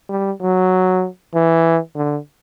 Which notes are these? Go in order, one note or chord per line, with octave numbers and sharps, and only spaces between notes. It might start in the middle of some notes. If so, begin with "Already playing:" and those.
G3
F#3
E3
D3